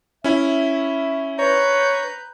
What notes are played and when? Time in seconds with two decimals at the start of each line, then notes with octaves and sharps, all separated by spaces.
0.24 C#4 E4 E5
1.39 B4 C#5 A#5 G6